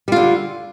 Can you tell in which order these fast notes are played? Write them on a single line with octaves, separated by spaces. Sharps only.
G3 F4 D3